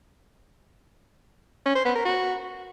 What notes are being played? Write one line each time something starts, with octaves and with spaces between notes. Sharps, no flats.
C#4
C5
B3
A#4
F#4